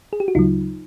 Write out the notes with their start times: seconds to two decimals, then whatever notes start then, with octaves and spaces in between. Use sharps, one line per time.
0.13 G#4
0.20 G4
0.28 F#4
0.35 D2 C#3 F#3 D#4 F4